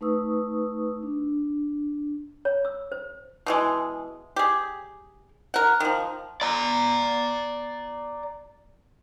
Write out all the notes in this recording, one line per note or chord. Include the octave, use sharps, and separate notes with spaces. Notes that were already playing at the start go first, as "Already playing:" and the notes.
A3 D#4 B4 C#6 D#6 E6
D4
C#5
E6
C5
B2 E3 G#3
G4 G#4
A#4 F#5
D#3 F3
D5 A#5